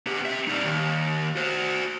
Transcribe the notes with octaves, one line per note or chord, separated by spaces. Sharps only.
B3 G4
C4 E5
G3 D#4
D#2
F#4 C5